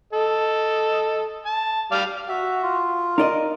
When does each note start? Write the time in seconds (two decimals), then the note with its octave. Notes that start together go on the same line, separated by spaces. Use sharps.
0.13 A4 D#5
1.46 A5
1.91 G3 D5 F5
2.29 F#4 E5
2.63 F4
3.18 D#4 A#4 D5 D#5